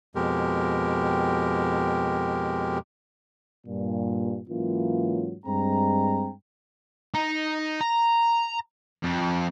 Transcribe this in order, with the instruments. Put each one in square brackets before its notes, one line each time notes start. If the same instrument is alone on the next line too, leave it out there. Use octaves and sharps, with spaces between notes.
[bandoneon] F2 B2 G#3 G4 A#4
[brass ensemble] G2 A#2
G#2 E3 F#3 A#3 C#4 F4
G2 G#3 C4 G5 A#5
[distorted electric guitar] D#4
A#5
F2